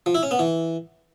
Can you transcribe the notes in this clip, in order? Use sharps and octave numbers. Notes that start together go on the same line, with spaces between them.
F3
E4
C#4
B3
E3